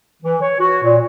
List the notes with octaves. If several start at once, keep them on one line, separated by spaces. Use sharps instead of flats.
E3
C#5
F#4
A#2